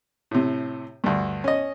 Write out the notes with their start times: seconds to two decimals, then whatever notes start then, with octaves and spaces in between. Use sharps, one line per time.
0.31 A2 C3
1.04 D2 G2
1.44 C#4 D#5